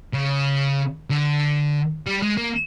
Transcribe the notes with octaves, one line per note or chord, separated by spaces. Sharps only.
C#3
D3
G3
G#3
A#3